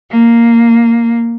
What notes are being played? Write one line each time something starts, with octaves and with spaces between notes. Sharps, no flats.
A#3